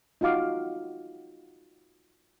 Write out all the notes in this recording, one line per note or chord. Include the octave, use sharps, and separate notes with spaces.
D#4 F4 F#4 F5 D6